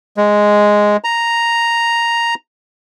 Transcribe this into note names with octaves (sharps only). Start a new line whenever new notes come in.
G#3
A#5